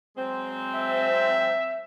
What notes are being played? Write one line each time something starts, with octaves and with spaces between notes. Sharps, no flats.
F#3 G#3 C4
E5